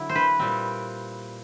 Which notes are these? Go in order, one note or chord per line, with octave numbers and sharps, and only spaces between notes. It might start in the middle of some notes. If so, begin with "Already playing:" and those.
Already playing: D3 F#3 E4
C5
B4
A#2 G3 C4